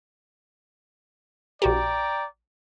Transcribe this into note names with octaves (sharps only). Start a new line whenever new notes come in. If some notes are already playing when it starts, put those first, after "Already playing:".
A#1 F#4 G4 D5 G5 A#5